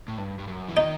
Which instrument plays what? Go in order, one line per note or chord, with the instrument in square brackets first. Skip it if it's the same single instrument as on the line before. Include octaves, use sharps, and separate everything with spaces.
[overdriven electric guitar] A2
G2
G2
F#2
E3
[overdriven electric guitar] D#3 [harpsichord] D#4